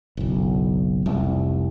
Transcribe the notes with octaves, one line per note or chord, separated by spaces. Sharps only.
F#1 B1
F1 C2